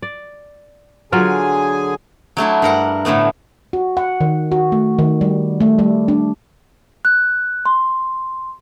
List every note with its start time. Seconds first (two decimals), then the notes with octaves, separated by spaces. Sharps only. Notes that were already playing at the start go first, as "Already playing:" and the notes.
0.02 D5
1.12 D3 F#3 F4 G#4 A#4 G#5
2.37 F#3 A3 D4 E4
2.62 G2 A#4 F#5
3.05 A2 D3 A3 B3
3.73 F#4
3.97 F#5
4.21 D#3
4.52 F#4
4.72 A3
4.99 D#3
5.21 G3
5.61 A3
5.79 G3
6.08 D4
7.05 F#6
7.65 C6